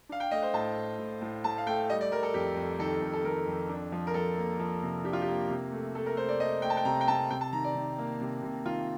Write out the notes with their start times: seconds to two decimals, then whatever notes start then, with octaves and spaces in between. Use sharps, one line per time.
0.09 D4 F5
0.20 G5
0.31 A3 D#5
0.42 C5
0.53 A2 A5
0.76 A2
0.98 A2
1.21 A2
1.44 A2 A5
1.58 F5
1.67 A3 G5
1.89 G3 D#5
2.01 D5
2.11 G3 A#4
2.23 A4
2.34 F2 G4
2.56 F2
2.79 D#3 A4
3.02 F2
3.13 A4
3.24 D#3 A#4
3.47 F2
3.69 D4
3.92 F3
4.07 A#4
4.14 F3 A4
4.37 A#3
4.59 F3
4.83 C3
5.04 D4 G4
5.13 F4
5.22 G4
5.28 A#3
5.49 C3
5.72 A3
5.95 A3 A4
6.06 A#4
6.17 A3 C5
6.29 D5
6.40 A3 D#5
6.62 A3 G5
6.70 A5
6.77 G5
6.85 C3 A#5
7.01 G5
7.08 C3 A5
7.30 C3 G5
7.41 A5
7.53 D#3 A#5
7.64 D5
7.75 D#3
7.98 A#3
8.21 C3
8.43 C3
8.65 D#3 F4